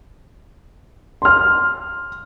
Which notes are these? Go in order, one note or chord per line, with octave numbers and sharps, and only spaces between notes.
C6 F6